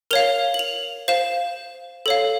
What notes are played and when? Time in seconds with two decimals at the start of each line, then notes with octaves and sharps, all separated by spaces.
0.11 A#4 C#5 F5 F7
0.54 F#7
0.59 F7
1.08 C5 F5 E7
2.06 A4 C#5 F5